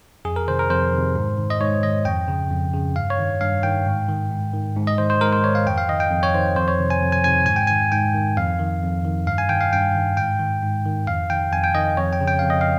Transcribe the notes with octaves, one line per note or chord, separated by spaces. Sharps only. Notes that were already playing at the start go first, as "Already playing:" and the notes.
F2 G#4
A#4
C3 D#3 C5
A#4
F2 C5
C3 D#3
G#2
D#3
D#5
G#2 C#5
D#3 D#5
F2 G5
C#3
F2
C#3
G2 F5
C#5
D#3
G2 F5
D#3 G5
G#2
D#3
G#2
D#3
G#2
D#5
D#3 C5
C5
G#2 A#4
C5
D#3 C#5
F5
F2 G5
F5
D#3 D#5
G5
F2
C#5
D#3 C5
F2 C5
C#5
C3 D#3
G#5
F2
G#5
C3 D#3 G#5
G#2 G#5
G5
D#3 G#5
G#2 G5
D#3
F2 F5
D#3
F2
D#3
G2 F5
G#5
D#3 G5
F5
G2 G5
D#3
G#2 G5
D#3
G#2
D#3
F2 F5
D#3 G5
F2 G#5
G5
D#3 D#5
F2 C#5
G5
C#3
G5
F2 F5
D#5
F5